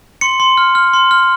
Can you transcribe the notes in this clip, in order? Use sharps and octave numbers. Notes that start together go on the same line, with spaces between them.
C6 C#7
C6
F6
F6
C6
F6